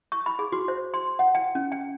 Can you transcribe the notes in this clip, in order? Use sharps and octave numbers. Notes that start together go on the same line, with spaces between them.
C#6
B5
G#4
F#4
C5
C6
F#5
G5
C#4
G5